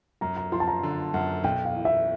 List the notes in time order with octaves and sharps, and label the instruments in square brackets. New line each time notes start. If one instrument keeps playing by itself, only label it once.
[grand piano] F#2 [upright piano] A#5
[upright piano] A#5
[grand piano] F3 [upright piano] C6
[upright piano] A5
A#5
[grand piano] D3
[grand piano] F#2 [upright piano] F#5
[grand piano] B1 [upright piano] G5
[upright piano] F5
[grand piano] E3
[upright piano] E5